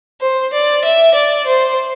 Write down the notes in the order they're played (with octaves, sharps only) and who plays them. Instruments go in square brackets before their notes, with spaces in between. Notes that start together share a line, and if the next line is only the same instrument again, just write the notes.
[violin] C5
D5
E5
D5
C5